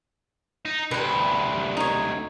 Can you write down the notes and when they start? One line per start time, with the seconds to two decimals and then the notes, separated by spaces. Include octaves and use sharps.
0.65 D#4
0.91 D2 C3 B4 B5
1.77 D#4 C#5